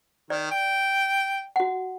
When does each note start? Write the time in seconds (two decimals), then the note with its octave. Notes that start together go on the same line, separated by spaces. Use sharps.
0.30 D#3 D5
0.51 G5
1.56 F#4 F#5